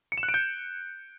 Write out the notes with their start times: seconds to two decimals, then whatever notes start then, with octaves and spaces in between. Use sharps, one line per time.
0.12 C#7
0.18 E7
0.23 F#6
0.29 D7
0.34 G6